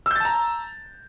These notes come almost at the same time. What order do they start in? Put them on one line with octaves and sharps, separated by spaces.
E6 G6 A6 A5 A#5